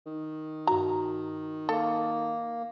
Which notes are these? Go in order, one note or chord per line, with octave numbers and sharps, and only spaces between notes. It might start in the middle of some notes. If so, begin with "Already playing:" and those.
D#3
G2 F#4 A#5
A#3 A4